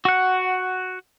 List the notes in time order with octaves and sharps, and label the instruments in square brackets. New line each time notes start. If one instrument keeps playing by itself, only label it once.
[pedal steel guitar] F#4 F#5